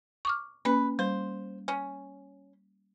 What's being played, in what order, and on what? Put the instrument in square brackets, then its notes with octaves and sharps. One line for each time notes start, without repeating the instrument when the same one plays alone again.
[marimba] C#6 D6 F6
[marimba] A#3 C#4 [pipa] B4
[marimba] G3 [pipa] C5
[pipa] C#4